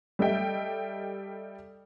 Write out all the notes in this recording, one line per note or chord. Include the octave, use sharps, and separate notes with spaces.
G3 A4 D#5 E5 G5